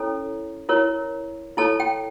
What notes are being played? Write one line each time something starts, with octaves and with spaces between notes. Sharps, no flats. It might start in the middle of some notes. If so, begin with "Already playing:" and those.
Already playing: C#4 E4 A4 C#5
E4 A#4 C#5
E4 A4 C#5 A5
G5